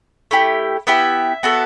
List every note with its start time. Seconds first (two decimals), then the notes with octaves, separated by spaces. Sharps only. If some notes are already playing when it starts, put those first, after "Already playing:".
0.31 A3 E4 G4
0.87 B3 E4 G4 E5
1.43 B3 F#4 A4